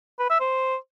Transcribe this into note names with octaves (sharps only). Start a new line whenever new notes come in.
B4
E5
C5